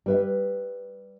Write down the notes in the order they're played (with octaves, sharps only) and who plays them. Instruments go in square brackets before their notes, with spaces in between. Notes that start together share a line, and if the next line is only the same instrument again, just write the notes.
[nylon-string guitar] G3 B4 E5